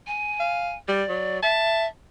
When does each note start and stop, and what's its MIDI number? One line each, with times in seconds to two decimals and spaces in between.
0.07 0.76 80
0.39 0.72 77
0.88 1.03 55
0.88 1.38 74
1.08 1.42 54
1.42 1.85 76
1.42 1.85 81